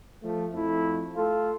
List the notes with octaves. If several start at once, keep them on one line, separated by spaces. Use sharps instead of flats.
F3 A3
F2 A3 E4
A3 F4 A4